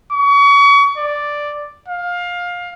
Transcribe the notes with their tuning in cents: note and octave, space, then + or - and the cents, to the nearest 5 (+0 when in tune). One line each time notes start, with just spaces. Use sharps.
C#6 +35
D5 +0
F5 +20